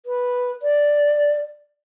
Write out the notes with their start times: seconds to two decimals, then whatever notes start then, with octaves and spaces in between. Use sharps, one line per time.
0.06 B4
0.63 D5